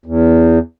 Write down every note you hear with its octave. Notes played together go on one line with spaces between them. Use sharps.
E2